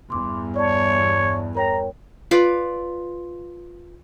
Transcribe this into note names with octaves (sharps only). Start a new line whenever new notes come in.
E2 G2 C6 D6
C#5 D5 A5
A#4 C#5 G5 A#5
F4 B4 D5